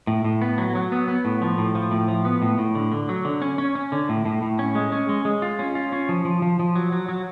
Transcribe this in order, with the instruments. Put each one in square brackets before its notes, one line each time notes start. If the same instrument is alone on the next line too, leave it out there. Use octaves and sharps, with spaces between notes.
[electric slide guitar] A2
A2
B3
F#3
F#3
B3
B3
A2
F3
A2
F3
A2
F3
B3
A2
A2
D3
D3
F#3
D3
C#4
C#4
C#4
D3
A2
A2
A2
C#4
G#3
C#4
G#3
G#3
F4
C#4
F4
C#4
F3
F3
F3
F3
F#3
F#3
F#3